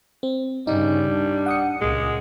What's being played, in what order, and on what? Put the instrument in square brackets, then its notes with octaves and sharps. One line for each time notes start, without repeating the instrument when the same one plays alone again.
[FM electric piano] C4
[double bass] G2 C#3 [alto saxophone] G3 [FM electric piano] D#4
[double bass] D4
[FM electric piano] F#5 D#6 C#7
[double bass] C#2 A#2 [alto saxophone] G#3